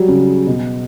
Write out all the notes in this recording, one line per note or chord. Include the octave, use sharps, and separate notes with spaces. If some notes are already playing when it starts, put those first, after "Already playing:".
Already playing: F#3 G3
C#3
B2